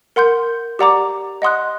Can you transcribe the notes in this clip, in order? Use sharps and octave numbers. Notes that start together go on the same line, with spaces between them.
A#4 F#5 C6 G6
G4 D5 F#5 A#5 D6
D#5 F#5 C6 D#6 F#6